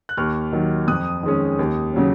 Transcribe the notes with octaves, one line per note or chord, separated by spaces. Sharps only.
F#6
D#2 C#6 F6
D#3 F#3
F2 D#6 F#6
D#3 G#3 C#4
D#2
C#3 F#3 C#4